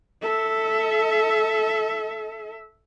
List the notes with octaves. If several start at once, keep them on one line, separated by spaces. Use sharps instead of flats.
A4 E5